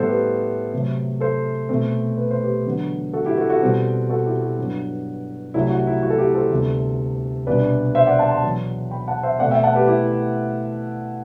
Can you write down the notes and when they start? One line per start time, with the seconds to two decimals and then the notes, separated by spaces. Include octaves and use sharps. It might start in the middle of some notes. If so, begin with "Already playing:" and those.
Already playing: A2 G3 B3 A4 C5
0.08 G4 B4
0.73 C3 F#3 A3 C4
1.20 A4 C5
1.69 B2 A3 C4
2.18 B4
2.31 C5
2.43 G4 B4
2.66 E2 D3 F#3 B3
3.13 F#4 A4
3.25 E4 G4
3.37 F#4 A4
3.50 F#4 A4
3.62 B2 G3 C4
4.09 F#4 A4
4.26 E4 G4
4.42 F#4
4.59 G2 F#3 B3 D4
5.54 C2 C3 F#3 A3 E4
5.70 F#4
5.87 E4
6.03 F#4
6.10 A4
6.18 E4 G4
6.35 A4 C5
6.50 D2 C3 G3 B3 D4
7.47 C2 B2 G3 D4 B4 D5
7.95 C5 E5
8.07 D5 F#5
8.19 F#5 A5
8.31 A5 C6
8.43 E2 B2 F#3
8.91 G5 B5
9.08 F#5 A5
9.23 C5 E5
9.39 B2 A3 C4 D5 F#5
9.51 E5 G5
9.63 F#5 A5
9.75 G4 B4
9.87 E4 G4